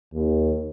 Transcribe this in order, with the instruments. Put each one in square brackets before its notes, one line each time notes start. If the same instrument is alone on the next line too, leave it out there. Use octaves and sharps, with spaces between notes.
[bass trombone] D#2